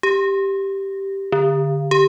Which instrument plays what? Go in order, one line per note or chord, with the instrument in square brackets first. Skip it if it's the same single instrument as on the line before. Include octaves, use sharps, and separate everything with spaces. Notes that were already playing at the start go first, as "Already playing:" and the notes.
[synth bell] G4
D3
G4